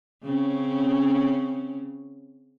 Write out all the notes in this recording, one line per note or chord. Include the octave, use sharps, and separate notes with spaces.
C#3 C4 C#4